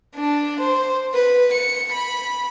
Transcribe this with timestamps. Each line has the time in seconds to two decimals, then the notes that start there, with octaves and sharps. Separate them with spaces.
0.15 D4
0.61 C5
1.14 B4
1.53 C#7
1.92 B5